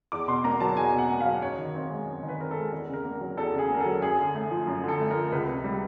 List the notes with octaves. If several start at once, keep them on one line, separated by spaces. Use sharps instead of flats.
E2 D6
B2 C6
A#3 A#5
F#3 A5
E2 G#5
B2
F#5
A#3
F#3 F5
F#2 C#5
D#3
C4
G#3
F#2
D#3
B4
C4 A#4
A4
G#3
E2
C#3
A#4
A#3
A#4
F#3
E2 A4
C#3 G#4
A#3 A#4
A4
F#3
F#2 G#4
D3
A3
F3
F#2
D3 A4
A3
A#4
F3
C#2 B4
C3
G3